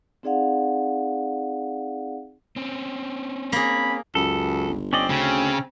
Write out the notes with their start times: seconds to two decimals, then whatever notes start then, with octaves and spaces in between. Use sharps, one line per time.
0.23 C4 D#4 G#4 D5 F5 F#5
2.56 C4 C#4
3.52 A#3 G#4 B5
4.15 C#2 F#2 A4
4.68 G1
4.93 C4 C#4 D5 D#5
5.10 D2 C#3 C#4